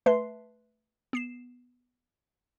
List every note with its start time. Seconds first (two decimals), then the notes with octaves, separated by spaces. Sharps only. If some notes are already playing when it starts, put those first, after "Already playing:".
0.06 A3 B4 E5 A5 C6 C7
1.13 B3 C7 E7